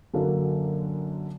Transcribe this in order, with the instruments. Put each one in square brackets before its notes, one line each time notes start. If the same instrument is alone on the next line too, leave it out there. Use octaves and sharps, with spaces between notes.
[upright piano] F#2 D3 F#3 A#3 D4